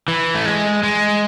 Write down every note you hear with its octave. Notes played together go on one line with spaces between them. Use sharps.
E3
A3
G#3
G#3